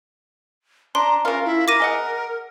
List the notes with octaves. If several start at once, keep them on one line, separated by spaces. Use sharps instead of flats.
D4 A#5 C6
C#3 F4 A#4
E4
A#4 D6 A#6 D#7
G#4 D#5 F#5